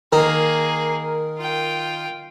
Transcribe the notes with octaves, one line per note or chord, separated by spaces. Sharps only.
D#3 A#3 G#4 A#4
F4 G5